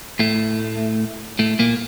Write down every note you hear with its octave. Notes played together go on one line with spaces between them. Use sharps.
A2 A3
A2 A3
A#2 A#3